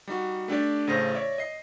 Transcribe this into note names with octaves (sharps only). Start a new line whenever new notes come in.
G3 D#4 F#4
A3 D4 G4 D5
A1 C#3 A3 C5 A#6
C#5 D5 E5
D#5 C7